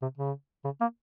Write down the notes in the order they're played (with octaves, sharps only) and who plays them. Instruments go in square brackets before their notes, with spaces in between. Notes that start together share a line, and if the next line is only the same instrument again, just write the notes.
[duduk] C3
C#3
C#3
A#3